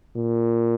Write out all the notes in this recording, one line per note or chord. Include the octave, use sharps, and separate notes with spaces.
A#2